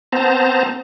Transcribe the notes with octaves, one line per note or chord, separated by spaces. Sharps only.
B3 C4 C5 A5 A#5